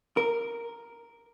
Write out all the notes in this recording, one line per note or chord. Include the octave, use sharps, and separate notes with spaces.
A#4